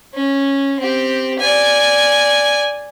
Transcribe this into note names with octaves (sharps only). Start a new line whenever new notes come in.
C#4
C4 G4
D5 G#5